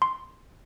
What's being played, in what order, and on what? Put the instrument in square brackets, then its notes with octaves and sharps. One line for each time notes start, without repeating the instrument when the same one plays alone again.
[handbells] C6